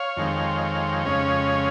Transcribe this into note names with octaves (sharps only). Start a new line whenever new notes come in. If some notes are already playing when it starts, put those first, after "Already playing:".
Already playing: C#5 F5
F2 D#3 G#3 C4
F2 C#3 G#3 C#4